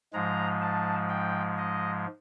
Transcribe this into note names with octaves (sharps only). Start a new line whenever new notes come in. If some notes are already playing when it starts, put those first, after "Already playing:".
G#2 F3 G#3 A#5
A5
G5
D#5